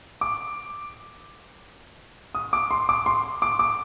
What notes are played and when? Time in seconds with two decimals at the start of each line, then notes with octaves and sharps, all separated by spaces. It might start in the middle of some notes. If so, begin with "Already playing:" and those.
0.21 D6
2.35 D#6
2.53 D6
2.71 C6
2.89 D6
3.06 C6
3.42 D6
3.59 D6